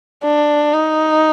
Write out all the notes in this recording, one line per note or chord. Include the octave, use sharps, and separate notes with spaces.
D4
D#4